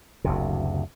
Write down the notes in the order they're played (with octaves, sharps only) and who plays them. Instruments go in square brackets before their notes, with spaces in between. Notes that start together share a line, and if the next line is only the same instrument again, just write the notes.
[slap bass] F#1 D2 C3